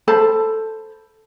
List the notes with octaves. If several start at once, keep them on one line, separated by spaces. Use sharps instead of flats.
A4 C5 A5 B5